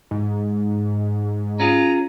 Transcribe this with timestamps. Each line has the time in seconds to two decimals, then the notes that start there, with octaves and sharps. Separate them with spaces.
0.11 G#2
1.60 C#4 F4 G#4 A#5